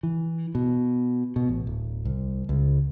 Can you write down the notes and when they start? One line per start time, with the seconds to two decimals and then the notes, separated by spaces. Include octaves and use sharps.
0.03 E3
0.55 B2
1.36 B2
1.49 A1
1.67 D1
2.05 C2
2.49 C#2